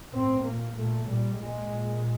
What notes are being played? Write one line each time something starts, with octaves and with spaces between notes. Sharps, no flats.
A2 C4
A#2 A#3
A#2 A3
A#2 G3
A#2 G#3
A#2